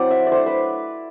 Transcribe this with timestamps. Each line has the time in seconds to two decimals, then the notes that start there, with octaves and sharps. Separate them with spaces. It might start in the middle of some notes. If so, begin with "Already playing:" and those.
Already playing: F#3 C4 E4 C5 D5 F#5
0.11 E5
0.27 D5
0.32 A3 D4 C5
0.46 B4